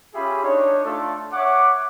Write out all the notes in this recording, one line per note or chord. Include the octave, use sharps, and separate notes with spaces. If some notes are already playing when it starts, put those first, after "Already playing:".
C#4 F4 G4 G#4 E5 B5
D4 D#4 C#5
A3 D4 F4 A4
C#5 E5 F#5 D6